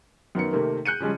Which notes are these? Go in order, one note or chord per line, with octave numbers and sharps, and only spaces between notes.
F#2 D#3 B3 C#7
C3 D#3 A3 A#3 C4
F#6 G6 C#7 D#7
C#3 F3 G3 G#3 C#4